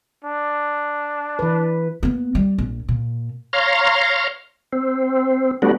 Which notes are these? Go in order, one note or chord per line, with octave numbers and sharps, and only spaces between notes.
D4
E3 B4
A#3 B3
G3
A#1
A#2
C#5 F5 A#5 C6
C4
G3 A3 B3 D4 F#4